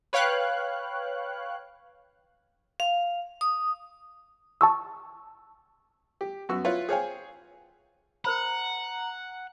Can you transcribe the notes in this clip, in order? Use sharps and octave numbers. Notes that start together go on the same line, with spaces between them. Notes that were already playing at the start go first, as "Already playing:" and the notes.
B4 C#5 F5 G5 F#6
F5
D#6
A5 C#6 E6
G4
F#2 B3 F#4 C#6 E6
E4 F4 B4 C#5 F5
G#4 C5 C#5 F5 G5 G#5
A#4 C5 F#5 A#5 B5